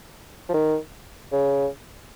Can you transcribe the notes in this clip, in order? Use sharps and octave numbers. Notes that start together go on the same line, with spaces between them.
F3
D#3
C#3